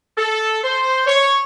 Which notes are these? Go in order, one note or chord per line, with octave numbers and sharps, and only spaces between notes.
A4
C5
C#5